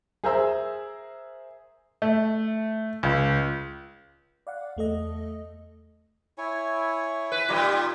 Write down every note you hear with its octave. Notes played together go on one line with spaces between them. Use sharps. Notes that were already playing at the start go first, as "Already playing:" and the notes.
G#4 A#4 C5 E5 A#5 E6
A3
C#2
D5 F5 F#5
E2 A3 A4 D#5
E4 C#5 G#5
B4
A#2 G3 D#4 F4 G4